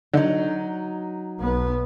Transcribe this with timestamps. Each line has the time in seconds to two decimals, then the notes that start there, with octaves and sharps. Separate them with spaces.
0.13 D3 F#3 D#4
1.39 B1 B3